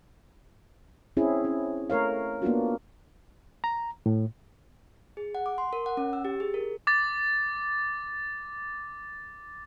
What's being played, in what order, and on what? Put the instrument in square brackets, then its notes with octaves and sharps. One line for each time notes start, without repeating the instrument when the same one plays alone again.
[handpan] C4 C#4 E4 G#4
C#4
A3 A#4 C#5 F5
A#3 B3 D4 F4 F#4
[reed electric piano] A#5
A2
[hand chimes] G#4
F#5
D6
C6
A#4
F#5
C#4
E6
G4
G#4
A#4
[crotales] D6 A6